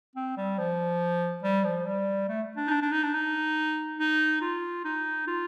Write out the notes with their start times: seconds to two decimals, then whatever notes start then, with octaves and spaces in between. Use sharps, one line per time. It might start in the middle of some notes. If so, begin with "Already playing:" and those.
0.16 C4
0.37 G3
0.58 F3
1.43 G3
1.65 F3
1.86 G3
2.29 A3
2.57 D4
2.67 D#4
2.71 D4
2.82 D4
2.92 D#4
3.03 D4
3.14 D#4
3.99 D#4
4.41 F4
4.85 D#4
5.28 F4